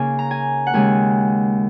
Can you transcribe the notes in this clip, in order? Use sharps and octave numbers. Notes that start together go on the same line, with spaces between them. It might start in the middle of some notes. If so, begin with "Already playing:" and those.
Already playing: C#3 A#3 C#4 D#4 G#5
A#5
G#5
F#5
D#2 C#3 G#3 G#5